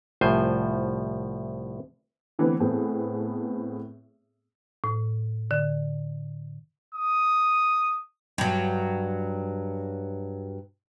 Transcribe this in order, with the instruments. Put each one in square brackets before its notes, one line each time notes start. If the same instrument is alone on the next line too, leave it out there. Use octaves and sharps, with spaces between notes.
[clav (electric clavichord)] C2 A2 F3 C5 G#5
[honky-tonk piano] D3 E3 A3 B3 C4 B4
A2 B3 C4 G#4 A4
[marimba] A2
D3
[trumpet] D#6
[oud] G2 F#3